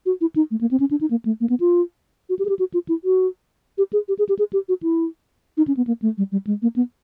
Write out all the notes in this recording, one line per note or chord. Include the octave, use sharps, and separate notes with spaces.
F#4
E4
D#4
A3
A#3
C4
C#4
D4
D#4
A#3
A3
A#3
B3
F4
F#4
G4
G#4
G4
F#4
F4
E4
F#4
G4
G#4
G4
G#4
G4
G#4
G4
F#4
E4
D#4
C#4
B3
A#3
A3
G3
G3
G#3
A#3
B3